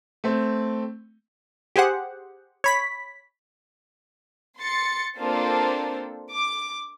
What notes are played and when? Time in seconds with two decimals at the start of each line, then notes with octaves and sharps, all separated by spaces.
0.24 A3 C4
1.76 G4 G#4 C5 F#5
2.64 C#5 B5 B6
4.58 C6 A6 C#7
5.18 A#3 C4 D4 F4 A4 C5
6.31 D6